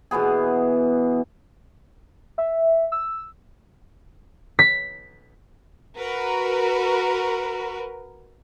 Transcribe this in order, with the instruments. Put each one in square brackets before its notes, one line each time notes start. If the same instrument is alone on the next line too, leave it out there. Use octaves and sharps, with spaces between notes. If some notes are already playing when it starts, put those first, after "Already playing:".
[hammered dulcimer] B2 E3 B3 G#4
[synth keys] E5
E6
[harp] B6
[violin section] F#4 A#4 B4